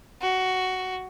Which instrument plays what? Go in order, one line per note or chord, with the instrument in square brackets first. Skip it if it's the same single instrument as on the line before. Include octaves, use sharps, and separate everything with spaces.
[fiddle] F#4